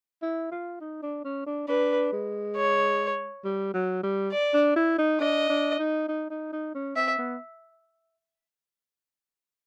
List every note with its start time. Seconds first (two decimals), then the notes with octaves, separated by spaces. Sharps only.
0.22 E4
0.51 F4
0.80 D#4
1.03 D4
1.24 C#4
1.46 D4
1.68 D4 B4
2.12 G#3
2.56 C#5
3.44 G3
3.74 F#3
4.03 G3
4.32 D5
4.54 D4
4.76 E4
4.98 D#4
5.20 D4 D#5
5.49 D4
5.79 D#4
6.08 D#4
6.30 D#4
6.52 D#4
6.74 C#4
6.96 C4 E5
7.18 B3